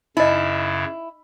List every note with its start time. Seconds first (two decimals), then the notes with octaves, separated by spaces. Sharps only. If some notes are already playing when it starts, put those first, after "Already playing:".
0.17 F#2 C#3 D#4 E4 D#5